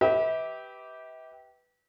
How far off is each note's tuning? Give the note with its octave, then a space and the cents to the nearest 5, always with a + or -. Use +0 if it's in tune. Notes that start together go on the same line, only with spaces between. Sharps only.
G4 -15 B4 +0 E5 -40